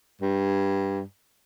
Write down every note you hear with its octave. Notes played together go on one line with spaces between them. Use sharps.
G2